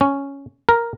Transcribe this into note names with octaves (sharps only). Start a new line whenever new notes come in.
C#4
A#4